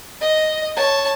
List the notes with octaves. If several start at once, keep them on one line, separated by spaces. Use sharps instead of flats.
D#5
C#5 A5